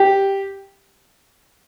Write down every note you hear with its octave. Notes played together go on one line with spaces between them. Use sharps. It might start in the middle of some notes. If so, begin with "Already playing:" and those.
Already playing: G4